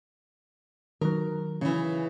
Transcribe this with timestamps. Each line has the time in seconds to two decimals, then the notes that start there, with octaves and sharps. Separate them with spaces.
1.01 D#3 F#3 A#4
1.61 C#3 E3